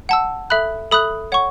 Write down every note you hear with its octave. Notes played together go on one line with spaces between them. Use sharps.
F#5 A5 E6
A4 E5 B5 D#6 F#6
A4 E5 B5 D#6 F#6
C#5 F#5 C#6